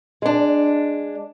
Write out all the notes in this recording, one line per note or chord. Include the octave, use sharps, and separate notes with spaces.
G#3 D4